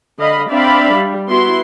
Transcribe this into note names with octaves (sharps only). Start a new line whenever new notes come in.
D3 D#5 F5 B5
C4 D4 D5 E5 F5 B5
G3
B3 E4 F#4 C6